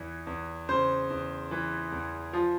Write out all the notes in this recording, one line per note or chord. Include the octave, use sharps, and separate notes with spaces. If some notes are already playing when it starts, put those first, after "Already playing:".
Already playing: E2 E3
E2
C#3 C5
E2
E3
E2
F3